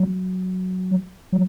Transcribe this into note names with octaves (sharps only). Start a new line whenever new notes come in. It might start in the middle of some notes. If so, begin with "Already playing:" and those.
Already playing: F#3
F#3